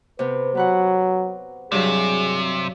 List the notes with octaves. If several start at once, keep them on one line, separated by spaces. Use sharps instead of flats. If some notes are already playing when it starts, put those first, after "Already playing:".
C3 B3 B4
F#3 B3 B4 F#5
G2 C3 F#3 G#4